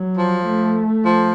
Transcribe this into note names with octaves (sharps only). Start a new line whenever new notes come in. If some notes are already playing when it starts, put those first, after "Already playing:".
Already playing: F#3
F3
A3
F3